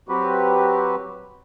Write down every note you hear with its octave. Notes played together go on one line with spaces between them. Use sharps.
F#3 C4 F#4 G4 B4